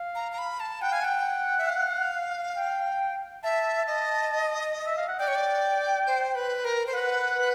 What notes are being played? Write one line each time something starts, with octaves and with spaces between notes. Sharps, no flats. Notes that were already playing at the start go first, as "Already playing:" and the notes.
Already playing: F5
A#5
A#5
B5
A5
F#5 G5
F5 G#5
F#5 G5
E5
F5
G5
E5 A5
D#5
E5
F5
F#5
D5 G5
C#5
D5
C5
B4
A#4
C5
B4 F#5